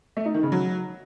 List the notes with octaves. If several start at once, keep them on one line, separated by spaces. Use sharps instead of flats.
A3
D#4
D#3
C#3
F#3